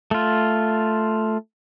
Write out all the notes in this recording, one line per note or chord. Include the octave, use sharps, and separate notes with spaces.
A3 F4